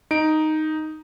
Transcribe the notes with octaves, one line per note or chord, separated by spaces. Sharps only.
D#4 D7